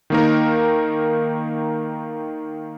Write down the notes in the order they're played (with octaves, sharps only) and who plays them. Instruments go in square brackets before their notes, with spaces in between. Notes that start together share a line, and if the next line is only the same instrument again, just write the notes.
[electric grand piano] D#3 A#3 D#4 A#4